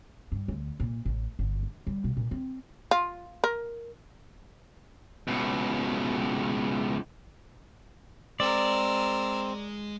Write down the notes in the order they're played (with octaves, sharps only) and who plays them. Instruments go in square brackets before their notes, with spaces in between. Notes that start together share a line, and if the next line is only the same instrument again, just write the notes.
[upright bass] G2
D2
A#2
A1
G1
D4
G3
B2
A#2
C4
[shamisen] F4
A#4
[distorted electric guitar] C#2 B2
[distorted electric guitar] G#3 [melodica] C4 [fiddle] A#4 E6 [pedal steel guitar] D5